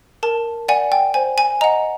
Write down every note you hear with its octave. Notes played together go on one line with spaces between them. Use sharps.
A#4 A5
D5 F#5 G#5
G5
C5 G#5
G#5
D#5 F#5 A#5